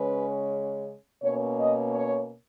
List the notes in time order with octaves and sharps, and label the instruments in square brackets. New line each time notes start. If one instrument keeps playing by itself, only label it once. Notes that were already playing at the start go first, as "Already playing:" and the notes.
Already playing: [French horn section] C#3 G#3 C#4 B4
B2 A#3 C#4 C#5
D#5
C#5